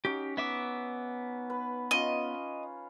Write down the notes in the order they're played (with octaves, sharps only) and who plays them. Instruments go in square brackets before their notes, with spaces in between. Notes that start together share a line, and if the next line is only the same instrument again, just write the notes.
[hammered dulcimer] C#4 D#4 F#4 [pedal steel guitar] G4
[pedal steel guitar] B3 E5 D6
[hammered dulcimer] B4
[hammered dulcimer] C#4 F4 [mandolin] D#5